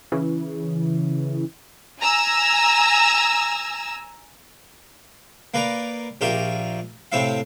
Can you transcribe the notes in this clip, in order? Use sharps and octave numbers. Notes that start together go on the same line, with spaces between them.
C#3 E3
G#5 A#5 E6
A#3 B4 D5 A#5
A#1 F4 G4 A#4 E5
A2 C3 C4 E4 E5 F5